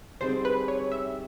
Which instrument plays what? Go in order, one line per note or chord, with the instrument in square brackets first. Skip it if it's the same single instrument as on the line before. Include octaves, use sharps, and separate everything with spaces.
[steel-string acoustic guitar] D3 G3 C4 D#4 G#4 [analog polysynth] C5
[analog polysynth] B4
C#5
E5